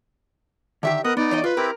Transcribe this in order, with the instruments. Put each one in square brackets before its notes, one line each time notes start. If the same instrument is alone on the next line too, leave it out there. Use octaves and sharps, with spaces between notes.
[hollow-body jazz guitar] D3 D#3 G4 [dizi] E5
[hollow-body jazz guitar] B3 [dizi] A#4 [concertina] D#5 D#6 F#6
[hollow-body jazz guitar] B3 [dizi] D#4 [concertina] D5
[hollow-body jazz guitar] E2 C#5 D#5
[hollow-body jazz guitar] F4 [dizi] B4
[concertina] C4 E4 G4 [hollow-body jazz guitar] A#4